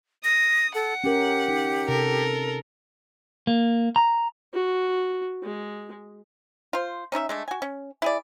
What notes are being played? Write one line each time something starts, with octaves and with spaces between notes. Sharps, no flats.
D#6 A#6
A4 F#5
C#4 G4 A#4
D#4
C3 A4 A#4
A#3
A#5
F#4
G#3
F4 C5
C#4 D#4 C#5 E5
G#3 A3 D4
F#4 G#5
C#4
E4 G#4 D5